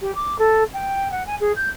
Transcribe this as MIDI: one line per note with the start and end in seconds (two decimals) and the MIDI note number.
0.01 0.14 67
0.15 0.38 86
0.38 0.64 69
0.73 1.10 79
1.11 1.25 78
1.27 1.35 80
1.40 1.52 68
1.56 1.69 91